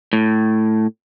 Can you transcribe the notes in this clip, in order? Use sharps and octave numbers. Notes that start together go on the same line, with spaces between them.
A2